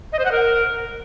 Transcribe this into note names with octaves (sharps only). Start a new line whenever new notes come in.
D#5
C5
F#5
A#4